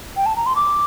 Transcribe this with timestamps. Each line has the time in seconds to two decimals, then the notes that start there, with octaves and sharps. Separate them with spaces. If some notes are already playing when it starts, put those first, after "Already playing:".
0.17 G5
0.26 A5
0.36 A#5
0.46 C6
0.56 D6